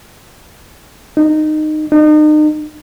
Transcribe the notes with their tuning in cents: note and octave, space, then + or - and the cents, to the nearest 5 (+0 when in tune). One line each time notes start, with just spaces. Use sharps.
D#4 -15
D#4 -35